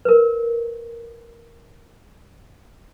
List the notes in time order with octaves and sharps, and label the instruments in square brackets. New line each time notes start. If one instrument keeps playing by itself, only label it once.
[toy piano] A#4 B4